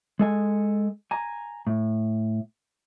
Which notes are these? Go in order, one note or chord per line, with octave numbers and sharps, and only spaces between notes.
G#3 A4 G#5
G#5 A#5
A2